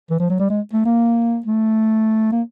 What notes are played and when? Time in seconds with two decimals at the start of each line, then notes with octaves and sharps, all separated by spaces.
0.11 E3
0.20 F3
0.30 F#3
0.40 G3
0.50 G#3
0.73 A3
0.86 A#3
1.46 A3
2.32 A#3